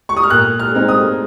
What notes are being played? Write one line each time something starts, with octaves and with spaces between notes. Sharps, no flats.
C#6
D#6
F6
A#2 F#6
F6
G#3 C4 D#4
D#6